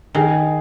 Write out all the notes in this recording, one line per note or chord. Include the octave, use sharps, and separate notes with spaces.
D#3 G#4